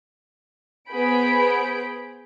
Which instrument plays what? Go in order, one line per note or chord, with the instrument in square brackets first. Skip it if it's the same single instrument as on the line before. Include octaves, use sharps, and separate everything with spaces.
[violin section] B3 G#4 C5 B5 G6 D7